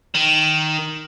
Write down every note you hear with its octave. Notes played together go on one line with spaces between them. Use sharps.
D#3